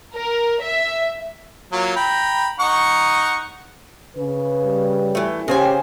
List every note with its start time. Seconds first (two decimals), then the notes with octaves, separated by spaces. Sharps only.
0.14 A#4
0.62 E5
1.72 F#3 A#3 F4
1.96 G5 A#5 B5
2.60 D#4 F#5 C#6
4.16 C#3 B4
4.65 G3
5.15 E3 A3
5.48 C#3 C#4 G4 C5 G#5